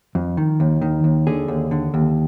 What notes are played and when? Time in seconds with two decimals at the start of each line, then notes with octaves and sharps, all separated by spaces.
0.15 F2
0.37 D#3
0.60 D#2
0.81 D#3
1.04 D#2
1.27 D3 G#4
1.48 D#2
1.71 D3
1.94 D#2